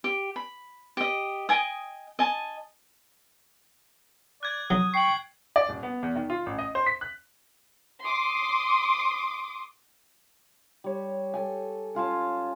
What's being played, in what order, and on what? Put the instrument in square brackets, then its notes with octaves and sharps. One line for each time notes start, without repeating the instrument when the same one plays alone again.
[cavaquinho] G4
B5
G4 D#5
D#5 G5 G#5 D#6
D#5 G#5 A5
[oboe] D5 [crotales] F#6 G#6
[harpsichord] F#3 [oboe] D#6
[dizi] G5 [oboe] C#6 [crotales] C7 F#7
[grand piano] D5
D#1
B3
E2
D#3
F4
A1
D#5
C5
B6
F#6
[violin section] C6 D6 D#6
[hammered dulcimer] G3 C#5
A4 G5 G#5
C#4 F4 G#5 A5